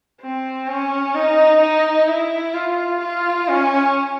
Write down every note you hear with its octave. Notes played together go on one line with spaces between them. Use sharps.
C4
C#4
D#4
D#4
E4
F4
F4
C#4